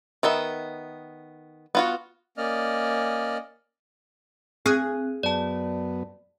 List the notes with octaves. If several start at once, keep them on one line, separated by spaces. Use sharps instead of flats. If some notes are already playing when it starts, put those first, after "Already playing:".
D#3 B3 D#5 E5
B3 F4 F#4
A#3 C#4 D5 D#5 F6
C4 G#4 F#6
F#2 B3 D5 A5